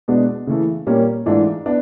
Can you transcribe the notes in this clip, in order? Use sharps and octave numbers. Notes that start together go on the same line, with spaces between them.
B2 G#3 B3 D4
C#3 E3 A3
A#2 G3 A#3 C#4
G#2 E3 A3 D4 F4
B3 D4